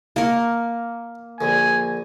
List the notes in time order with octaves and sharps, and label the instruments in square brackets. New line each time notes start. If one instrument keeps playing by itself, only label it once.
[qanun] A#3 A#4 [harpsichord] A5 C#6
[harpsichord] A#1 D3 [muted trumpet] G#5